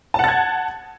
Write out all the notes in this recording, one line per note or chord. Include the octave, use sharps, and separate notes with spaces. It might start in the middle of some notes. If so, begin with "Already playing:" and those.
F#5 A5 G#6 A6